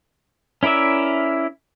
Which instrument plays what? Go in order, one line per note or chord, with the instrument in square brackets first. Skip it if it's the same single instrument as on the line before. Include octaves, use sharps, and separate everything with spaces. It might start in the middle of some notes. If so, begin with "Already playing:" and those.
[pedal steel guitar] C#4 E4 A#4 D5 E5